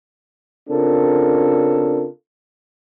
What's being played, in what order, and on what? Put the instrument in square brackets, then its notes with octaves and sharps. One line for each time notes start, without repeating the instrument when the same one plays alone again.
[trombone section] C#3 C4 D4 F4 A4 A#4